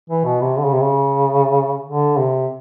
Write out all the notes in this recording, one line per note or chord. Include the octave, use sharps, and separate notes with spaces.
E3
B2
C3
D3
C#3
C3
C#3
D3
C3